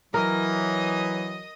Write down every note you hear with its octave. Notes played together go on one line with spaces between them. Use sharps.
E3 F#3 A#4 D#5 D#6